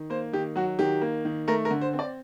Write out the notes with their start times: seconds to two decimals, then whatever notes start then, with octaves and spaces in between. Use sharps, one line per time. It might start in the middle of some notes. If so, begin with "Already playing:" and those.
Already playing: D#3
0.10 A#3 C5
0.33 D#3 G4
0.56 F#3 F#4
0.79 D#3 G4
1.01 A#3
1.25 D#3
1.48 A3 A#4
1.65 A#4
1.71 D3
1.81 C5
1.93 C4
1.99 D5